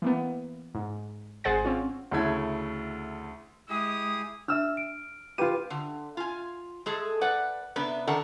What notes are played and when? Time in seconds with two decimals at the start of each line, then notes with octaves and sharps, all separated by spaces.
0.02 E3 A#3 B3
0.75 G#2
1.44 G#1 G#4 C5 F#5 A6
1.65 C4 C#4 F4
2.11 D2 C#3 A3 E4 G#6
3.69 G#3 E4 G4 G#4 D#6
4.48 D4 E5 E6 F6
4.77 D7
5.38 F4 G4 B4 D#7
5.70 D3
6.17 F4 G#5
6.86 G#3 G#4 A4
7.21 B4 D5 F#5
7.76 C3 B3 D4 B4
8.07 D#3 D4 A4 A#4 F#5